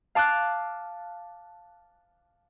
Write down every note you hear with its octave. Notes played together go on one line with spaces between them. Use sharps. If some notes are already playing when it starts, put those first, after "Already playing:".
F5 A5 D6 F6 F#6